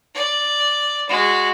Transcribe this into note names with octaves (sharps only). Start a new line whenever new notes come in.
D5
G#3 F#4